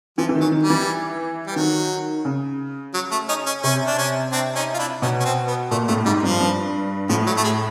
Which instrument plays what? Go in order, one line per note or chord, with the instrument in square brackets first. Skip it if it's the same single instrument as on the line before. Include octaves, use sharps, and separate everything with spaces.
[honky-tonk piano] E3 [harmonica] F3
[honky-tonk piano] E3
D#3
[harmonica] F#3
[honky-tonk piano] D#3
[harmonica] G3
[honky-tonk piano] E3
[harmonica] G3
[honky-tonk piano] D#3 [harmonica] F#3
[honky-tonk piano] C#3
[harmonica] F#3
A3
C#4 D#4
C#4
[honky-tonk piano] C3 [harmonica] C#4
[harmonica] D4
C#4
C4 D4
C#4 D#4
F4
D4 E4
[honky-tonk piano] B2 [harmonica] C#4 D#4
[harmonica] C#4
C4
B3
[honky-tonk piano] A#2 [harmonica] A3
[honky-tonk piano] A2 [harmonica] A3
[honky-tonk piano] G#2 [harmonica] G3
[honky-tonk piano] G2 [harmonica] F3
[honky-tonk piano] G2
[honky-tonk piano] A2 [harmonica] F3
[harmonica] F#3
A3
G#3